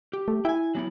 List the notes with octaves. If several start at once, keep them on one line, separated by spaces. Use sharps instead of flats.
G4
A3
E4 G5 G#5
F#3 B3 E4